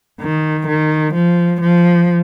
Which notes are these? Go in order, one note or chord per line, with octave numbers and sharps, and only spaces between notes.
D#3
D#3
F3
F3